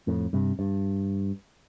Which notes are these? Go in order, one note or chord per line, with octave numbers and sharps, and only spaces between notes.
F2 A2
G2 C3
G2